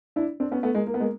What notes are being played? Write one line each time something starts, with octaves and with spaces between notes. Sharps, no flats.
D4 E4
C4 D4
B3 C#4
A3 B3
G#3 A#3
A#3
B3
G#3 A#3